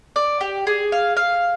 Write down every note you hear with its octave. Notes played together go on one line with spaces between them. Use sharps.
D5
G4
G#4
F5
F5